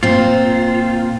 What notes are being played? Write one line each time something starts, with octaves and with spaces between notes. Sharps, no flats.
A#2 C4 F4